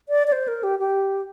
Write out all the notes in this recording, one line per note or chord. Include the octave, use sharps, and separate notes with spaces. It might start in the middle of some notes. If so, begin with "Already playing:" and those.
D5
D5
C5
A#4
G4
G4